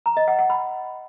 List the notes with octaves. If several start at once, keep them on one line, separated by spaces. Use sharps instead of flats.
A#5
D#5
F#5
F#5
B5